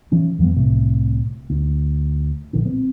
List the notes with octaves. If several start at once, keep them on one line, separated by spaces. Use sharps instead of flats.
E3 C#4
F2 E3 G3 B3
C2 A2 C3
D2
A#1 D3 D#3
A#3 C4